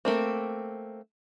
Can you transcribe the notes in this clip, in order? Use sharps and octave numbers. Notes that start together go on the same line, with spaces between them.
A3 A#3 C4